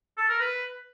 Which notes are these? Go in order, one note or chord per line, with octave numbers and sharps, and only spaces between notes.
A4
A#4
B4